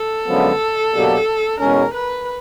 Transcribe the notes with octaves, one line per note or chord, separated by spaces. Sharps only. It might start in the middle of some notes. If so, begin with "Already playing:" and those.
Already playing: A4
F#2 D3 F3 G#3 B3
B2 F#3 A#3 D4 G4
E2 B2 G#3 C#4 A#4
B4